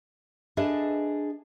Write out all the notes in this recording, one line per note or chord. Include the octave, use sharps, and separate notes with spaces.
D4 G#4 A4 B4 D#5 E5